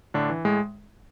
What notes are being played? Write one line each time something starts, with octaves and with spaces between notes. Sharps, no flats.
A2 D3 D4
E3
A2 G#3